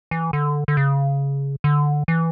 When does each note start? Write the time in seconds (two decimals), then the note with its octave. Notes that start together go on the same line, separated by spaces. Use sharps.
0.11 E3
0.33 D3
0.68 D3
0.77 C#3
1.64 D3
2.08 E3